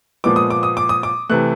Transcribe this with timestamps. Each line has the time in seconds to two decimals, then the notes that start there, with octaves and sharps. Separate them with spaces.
0.24 A#2 F3 G#3 B3 D6
0.36 D#6
0.50 D6
0.63 D#6
0.77 D6
0.89 D#6
1.03 D6
1.29 C3 E3 A3 F#6